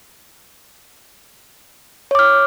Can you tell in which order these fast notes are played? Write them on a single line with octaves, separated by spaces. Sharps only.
C#5 D6 F6